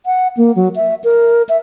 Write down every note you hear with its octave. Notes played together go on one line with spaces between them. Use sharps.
F#5
A#3
F#3
E5
A#4
E5